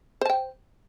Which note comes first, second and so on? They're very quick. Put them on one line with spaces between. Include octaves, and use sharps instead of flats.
C5 A5 G5